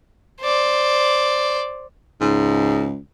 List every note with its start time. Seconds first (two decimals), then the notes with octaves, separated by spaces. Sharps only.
0.41 C5 D5
2.21 C#2 G#2